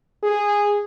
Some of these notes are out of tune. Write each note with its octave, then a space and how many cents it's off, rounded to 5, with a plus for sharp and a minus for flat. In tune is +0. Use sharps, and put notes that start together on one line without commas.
G#4 -10